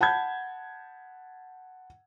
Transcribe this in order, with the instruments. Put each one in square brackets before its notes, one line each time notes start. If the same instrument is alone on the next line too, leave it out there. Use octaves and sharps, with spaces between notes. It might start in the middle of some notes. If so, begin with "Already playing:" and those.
[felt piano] F#5 A5 B5 G6 G#6